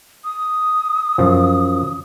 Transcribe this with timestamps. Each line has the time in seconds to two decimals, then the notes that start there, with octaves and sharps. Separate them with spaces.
0.24 D#6
1.18 F#2 F3